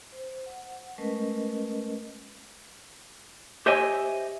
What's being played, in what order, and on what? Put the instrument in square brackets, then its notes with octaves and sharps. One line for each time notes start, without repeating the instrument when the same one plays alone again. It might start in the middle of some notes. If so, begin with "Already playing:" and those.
[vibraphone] C5
F#5
G#3 A3 C#4 A#4 B4 D#5
[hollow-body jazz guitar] G4 C5 C#5 D#5 E5 G#5